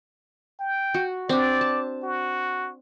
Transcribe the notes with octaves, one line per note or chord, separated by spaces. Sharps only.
G5
F#4
C4 D4 D5
A5
F#4